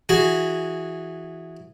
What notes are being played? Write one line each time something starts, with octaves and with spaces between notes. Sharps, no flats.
E3 F#4 G#4